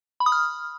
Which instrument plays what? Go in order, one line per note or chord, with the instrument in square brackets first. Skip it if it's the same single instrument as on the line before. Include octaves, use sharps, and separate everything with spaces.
[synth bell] B5
D#6
F6